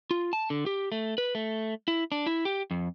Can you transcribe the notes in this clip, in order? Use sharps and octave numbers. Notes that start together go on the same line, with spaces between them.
F4
A5
D3
G4
A3
B4
A3
E4
D4
E4
G4
F2